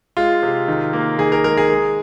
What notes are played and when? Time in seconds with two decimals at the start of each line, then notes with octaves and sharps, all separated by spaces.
0.17 G#3 F4
0.43 C3
0.68 D#3
0.93 A#3
1.18 D#3 G#4
1.32 A#4
1.44 G#3 A#4
1.57 G#4
1.70 G#3